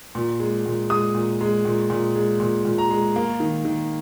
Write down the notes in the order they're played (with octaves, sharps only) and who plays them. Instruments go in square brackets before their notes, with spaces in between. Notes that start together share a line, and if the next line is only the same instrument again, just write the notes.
[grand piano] A#2
G#3
A#2
G#3 D#6
A#2
G#3
A#2
A#2
G#3
A#2
A#2
A#5
G#3
A#3
D#3
D#3